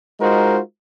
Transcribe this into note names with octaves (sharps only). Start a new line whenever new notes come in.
G#3 D#4 F4 F#4 A#4 C5